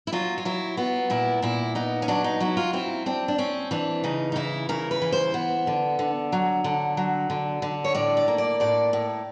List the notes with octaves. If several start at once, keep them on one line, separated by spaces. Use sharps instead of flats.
E4
F#3 F4
F4
F#3 E4
B3 F4
A#2 E4
A#2 E4
B3 D#4
C#4
F#3 D4
D#4
F#3 E4
F4
C4 E4
C4 D4
D4
C4 C#4
E3 D4
C#3 D#4
D#4
E3 E4
C#3 A#4
B4
E3
C5
B3
D3
D3
F#3
D3
F#3
D3
D3
C#5
A2 D5
D5
A#3
D5
A2 D5
A2